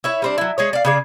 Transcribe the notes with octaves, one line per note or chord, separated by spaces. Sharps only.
E4 C#5 E5
G3 C4 D4
F#3 E4
G#3 G#4 C#5
D5 F5
C#3 G#4 D5